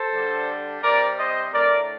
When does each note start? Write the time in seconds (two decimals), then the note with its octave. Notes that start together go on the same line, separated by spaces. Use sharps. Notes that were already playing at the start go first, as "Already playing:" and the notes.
Already playing: A4 C5
0.12 D3 G3 D4
0.82 C3 G3 C4 A#4 D5
1.18 C5 D#5
1.53 A2 A3 D4 A#4 D5